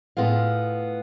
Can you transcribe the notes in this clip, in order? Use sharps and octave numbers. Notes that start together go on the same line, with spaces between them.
A2 B3 F4 G#4 F5